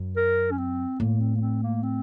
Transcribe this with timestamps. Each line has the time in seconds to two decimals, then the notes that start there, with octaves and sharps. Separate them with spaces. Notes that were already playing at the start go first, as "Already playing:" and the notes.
Already playing: F#2
0.16 A#4
0.52 C#4
0.58 C4
1.00 A2 A#3
1.20 C4
1.35 A#3
1.41 C4
1.63 A#3
1.83 C4